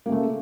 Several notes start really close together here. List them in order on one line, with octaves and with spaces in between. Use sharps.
A#3 C#3 A3